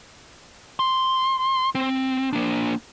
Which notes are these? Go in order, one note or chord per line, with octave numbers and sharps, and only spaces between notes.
C6
C4
A#3 D4